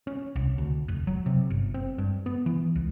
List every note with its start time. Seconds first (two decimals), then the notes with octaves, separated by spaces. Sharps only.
0.07 C#4
0.36 C2
0.58 D2
0.88 F1
1.07 F#3
1.26 C3
1.50 G1
1.74 C4
1.98 G2
2.26 B3
2.46 E3
2.76 C#2